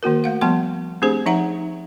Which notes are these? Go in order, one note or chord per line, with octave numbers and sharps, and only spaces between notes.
D#3 A#3 F#4 A#4
A3 F5 F#5
F3 G3 B3 F#5 A5 C6
A3 C4 D4 G4 G#4 C5
F3 D#4 E5 F#5 A#5